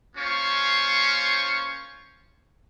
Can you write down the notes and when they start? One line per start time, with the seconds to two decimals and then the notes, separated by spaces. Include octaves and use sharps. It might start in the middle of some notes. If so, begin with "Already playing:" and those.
0.16 A#3 C#4 F4 C5 C#6